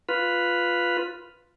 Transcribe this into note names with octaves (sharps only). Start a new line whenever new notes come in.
F4 B4